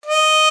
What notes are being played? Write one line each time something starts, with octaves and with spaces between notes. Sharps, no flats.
D#5